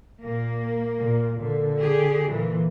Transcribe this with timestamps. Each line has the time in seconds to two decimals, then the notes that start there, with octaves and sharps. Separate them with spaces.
0.24 A#2 A#3
0.99 A#2
1.40 A#2 D3
1.80 G4 G#4
2.31 A#2 E3